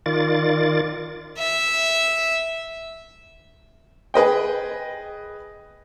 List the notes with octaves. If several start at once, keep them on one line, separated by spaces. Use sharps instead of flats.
D#3 F4 D5 A6
E5
G#4 B4 D#5 G5